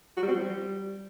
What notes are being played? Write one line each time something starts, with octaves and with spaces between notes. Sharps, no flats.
F#4
G3
C4
F3
G3